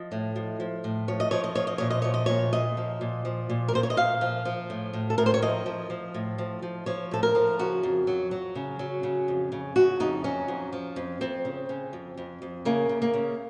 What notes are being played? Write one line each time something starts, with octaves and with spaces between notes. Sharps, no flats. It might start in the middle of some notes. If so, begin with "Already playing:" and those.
Already playing: F3 D#5
A2
F3
F3
A2
F3 C#5
D#5
F3 C#5
D#5
F3 C#5
D#5
A#2 C#5
D#5
F3 C#5
D#5
A#2 C#5
A#2 D#5
F3
A#2
F3
A#2
A#4
A#2 C5
C#5
D#5
A#2 F5
F3
F3
A2
A2
A4
A2 A#4
C5
C#5
F3 D#5
F3
F3
A2
F3
F3
F3 C#5
A2 A4
A#4
F3
C#3 F#4
F2
F#3
F#3
C#3
F#3
C#3
F2
C#3
C#3 F#4
F2 D#4
F#3 C#4
F2
F3
F2
F2 C4
C#3
C#3
F2
F2
F2
C#3 A#3
C#3
A#3
C#3